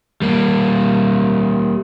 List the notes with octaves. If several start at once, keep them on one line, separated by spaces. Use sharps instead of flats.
G3 A#3